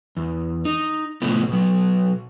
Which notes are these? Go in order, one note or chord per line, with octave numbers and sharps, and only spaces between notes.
E2
D#4
A2 C3 F3 A3 B3
B2 F#3